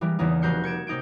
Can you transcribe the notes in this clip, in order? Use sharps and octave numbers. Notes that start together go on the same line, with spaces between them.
E3 G3 G#3 A#3
E2 C#3 E3 A#3 D#4
F1 F#4 A#4 G6 C7 C#7
G#6 C#7 D7 E7
C3 A#3 D#4 G6 D7